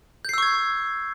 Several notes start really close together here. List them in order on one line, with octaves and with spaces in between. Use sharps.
G6 C7 E6 C#6 G#6